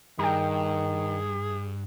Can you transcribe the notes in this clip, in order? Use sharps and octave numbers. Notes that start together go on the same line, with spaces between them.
G2 D#3 G#4 G5 A#5